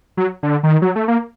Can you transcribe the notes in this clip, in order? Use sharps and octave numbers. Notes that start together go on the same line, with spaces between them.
F#3
D3
D#3
F#3
A3
A#3